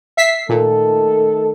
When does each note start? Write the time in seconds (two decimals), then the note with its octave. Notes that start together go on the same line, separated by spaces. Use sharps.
0.17 E5 B6 C7
0.49 A#2 D#3 A3 A4